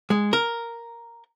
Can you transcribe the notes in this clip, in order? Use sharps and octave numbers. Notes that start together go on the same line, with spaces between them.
G#3
A#4